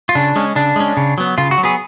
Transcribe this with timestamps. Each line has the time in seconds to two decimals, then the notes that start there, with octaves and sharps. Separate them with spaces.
0.09 F4
0.15 C#3 D4
0.36 G#3 C#4
0.56 C#3 D4
0.76 G#3 C#4
0.97 C#3
1.18 F#3 B3
1.38 C#3 F4
1.51 F#4
1.58 F#3
1.63 B3 G#4